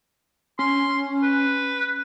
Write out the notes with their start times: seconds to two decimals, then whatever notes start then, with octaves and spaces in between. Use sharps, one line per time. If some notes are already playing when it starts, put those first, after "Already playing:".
0.59 C#4 C6
1.22 B4